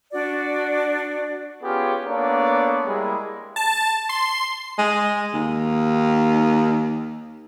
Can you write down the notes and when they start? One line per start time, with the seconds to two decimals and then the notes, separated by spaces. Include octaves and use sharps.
0.12 D4 F#4 D5
1.63 B3 C#4 F4 G4 G#4
2.06 A#3 B3 D4 A4 C#5 D5
2.86 G3 G#3 A#3 E4 G#4
3.56 A5
4.09 C6
4.79 G#3
5.34 D#2